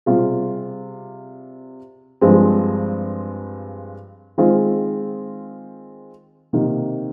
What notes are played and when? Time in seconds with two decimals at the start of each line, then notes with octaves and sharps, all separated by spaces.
0.06 C3 G3 C4 F4 G#4
2.21 G2 F3 G#3 C4
4.38 D#3 G#3 C4 F4 G#4
6.53 C3 D#3 A#3